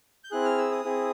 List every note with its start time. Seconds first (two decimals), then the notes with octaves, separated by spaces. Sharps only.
0.24 G6
0.31 C4 E4 G#4 F#6
0.45 F6
0.58 E6
0.72 D#6
0.85 C4 E4 G#4